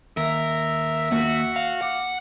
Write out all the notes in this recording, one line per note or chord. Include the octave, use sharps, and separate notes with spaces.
D#2 A#4 E5
A#3 F#4
F5
F#5 D6